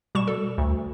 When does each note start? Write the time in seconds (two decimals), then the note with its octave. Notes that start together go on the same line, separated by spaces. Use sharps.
0.15 B2 G3 C#6 E7
0.27 A4
0.58 D2